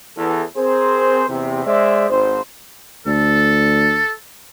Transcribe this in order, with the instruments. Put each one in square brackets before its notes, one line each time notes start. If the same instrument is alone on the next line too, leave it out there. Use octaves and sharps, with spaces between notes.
[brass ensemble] E2 E3 A4
C4 G#4 A#4 C5
E2 C3
G#3 C5 D5 E5
G#1 C5
[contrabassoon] D2 [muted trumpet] A4